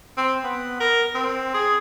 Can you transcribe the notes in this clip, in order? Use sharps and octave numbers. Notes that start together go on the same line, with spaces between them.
C4
B3
A#4
C4
G#4